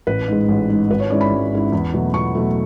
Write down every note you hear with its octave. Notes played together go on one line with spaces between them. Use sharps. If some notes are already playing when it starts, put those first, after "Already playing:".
A1 B4
G#2 G#3
A1
G#2 G#3
G#1 B4
C#5
G#2 G#3 C#4 E4 D5
B5
G#1
G#2 G#3 C#4 E4
E2
B2 F#3 A3
E2 C#6
B2 F#3 A3